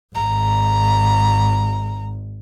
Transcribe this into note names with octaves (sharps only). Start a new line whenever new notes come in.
G#1 A#5